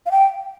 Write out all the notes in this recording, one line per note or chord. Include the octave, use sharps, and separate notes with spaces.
F5
G5